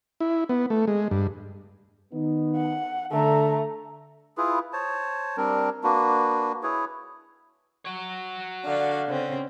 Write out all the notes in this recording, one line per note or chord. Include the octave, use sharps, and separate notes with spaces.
E4
B3
A3
G#3
G2
D#3 B3 D#4
F#5
D3 A3 A#5
E4 F4 G#4 B4
C5 C#5 A5
G3 C4 D4 A#4
A#3 D4 F#4 B4
E4 G#4 B4 C#5
F#4 C#5
D3 D5 F5
C#3 C4 C#4